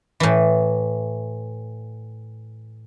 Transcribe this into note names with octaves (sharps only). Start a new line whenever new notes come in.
A2 E3